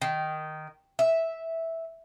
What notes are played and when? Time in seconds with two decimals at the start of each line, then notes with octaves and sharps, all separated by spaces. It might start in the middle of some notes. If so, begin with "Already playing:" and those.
0.02 D#3
0.99 E5